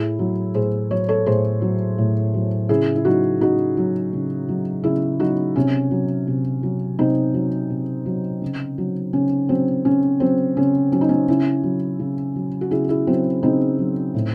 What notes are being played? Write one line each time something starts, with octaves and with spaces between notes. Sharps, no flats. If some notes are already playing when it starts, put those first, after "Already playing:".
Already playing: A2 E4 G#4
F#3
A2 G#4 C5
F#3 C#5
A4 C#5
A2 G#4 C5
F#3
A2
F#3
C#3 E4 G#4
E4
F#3 D#4 F#4
C#3 D#4 F#4
F#3
C#3
F#3
C#3 E4 G#4
F#3 D#4 F#4
C3 C#4
F#3
C3
F#3
C3 C4 D#4
F#3
C3
F#3
C#3
F#3
C#3 C#4
F#3 C4
C#3 C#4
F#3 C4
C#3 C#4
F#3 C#4
D#4
C#4
C#3 C#4 E4
F#3
C#3
F#3
F#4
C#3 E4 G#4
E4 G#4
F#3 C4
C#3 C4 D#4
F#3
A2